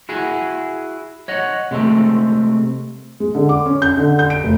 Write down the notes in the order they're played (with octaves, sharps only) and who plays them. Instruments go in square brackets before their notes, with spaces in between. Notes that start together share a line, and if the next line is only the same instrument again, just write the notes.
[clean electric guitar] E4 F#4 G#4
C#5 D#5 F#5
C3 G#3 A3 C4
[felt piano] G#3
D3
D6
C#4
G6
D3
G6
D7
F1